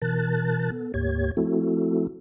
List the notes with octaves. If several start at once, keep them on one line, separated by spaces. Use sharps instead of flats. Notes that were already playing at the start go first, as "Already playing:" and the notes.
B2 E3 A#4 A5 F#6 A6
B3 A4
D2 G#2 A#3 G4 C#5 G#6
F3 A3 C4 E4 F#4 A4